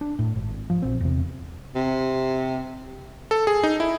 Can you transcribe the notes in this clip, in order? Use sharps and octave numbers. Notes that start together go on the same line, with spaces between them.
D4
A2
G#1
F3
A#1 C4
E2 C3
C3
A4
G#4
D#4
E4